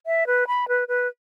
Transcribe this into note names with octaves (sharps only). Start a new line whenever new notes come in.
E5
B4
B5
B4
B4